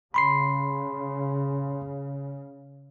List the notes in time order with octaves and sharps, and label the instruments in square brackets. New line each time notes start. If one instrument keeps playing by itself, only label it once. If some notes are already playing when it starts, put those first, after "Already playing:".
[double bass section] C#3 [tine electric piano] B5 C6 C7